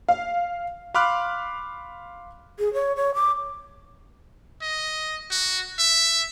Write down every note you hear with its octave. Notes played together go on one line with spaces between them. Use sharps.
F5
F5 B5 C6 D6 F6 F#6
G#4
C#5
C#5
D6
D#5
F#4
E5